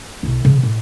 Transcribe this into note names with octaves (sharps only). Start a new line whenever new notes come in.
B1 E4
C#3 F3
A2